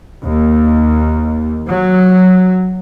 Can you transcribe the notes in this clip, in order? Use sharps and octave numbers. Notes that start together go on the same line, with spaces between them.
D#2
F#3